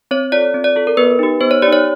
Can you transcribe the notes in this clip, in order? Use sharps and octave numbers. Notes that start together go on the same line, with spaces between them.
C4 C#5
F4 A4 D5
C4
D5
F4 A4
A#4
B3 B4
D#4 G4
B3 C5
C#5
D#4 G4 D5
C#5